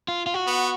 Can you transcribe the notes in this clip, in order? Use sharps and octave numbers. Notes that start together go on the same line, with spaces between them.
F4
F4
F#4
B3